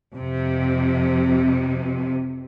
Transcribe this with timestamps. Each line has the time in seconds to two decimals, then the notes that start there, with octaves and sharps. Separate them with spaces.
0.16 F2 C3